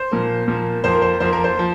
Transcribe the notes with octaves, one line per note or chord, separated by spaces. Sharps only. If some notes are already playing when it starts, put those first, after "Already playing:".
Already playing: C5
A#2 F3 A#3
A#2 F3 A#3
F2 F3 A#3 C5
A#4
C5
F2 F3 A#3 C5
A#4
C5
F3